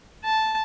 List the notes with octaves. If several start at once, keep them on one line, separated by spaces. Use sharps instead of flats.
A5